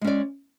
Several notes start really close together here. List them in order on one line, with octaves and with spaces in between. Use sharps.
G#3 C#4 D5